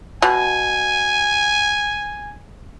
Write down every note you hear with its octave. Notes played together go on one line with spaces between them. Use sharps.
B2 G#5